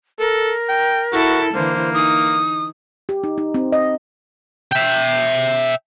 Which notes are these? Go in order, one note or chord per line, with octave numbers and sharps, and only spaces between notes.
A4 A#4
G5
E4 F#4 A4
D3 E3 A#3 C5
D#4 D#6
G4
D#4
D#4
C4
D#5
E5 G5